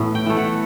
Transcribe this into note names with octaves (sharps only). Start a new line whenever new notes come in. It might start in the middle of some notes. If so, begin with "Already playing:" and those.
Already playing: A2 E3 B3 E5
G5
E3 A3
F#5